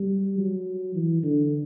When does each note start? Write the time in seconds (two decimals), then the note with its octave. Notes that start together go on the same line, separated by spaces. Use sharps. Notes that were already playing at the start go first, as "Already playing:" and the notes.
Already playing: G3
0.38 F#3
0.95 E3
1.23 D3